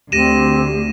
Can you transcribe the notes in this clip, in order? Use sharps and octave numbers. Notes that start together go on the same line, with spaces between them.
D2 C4 G4 A#6 D#7 E7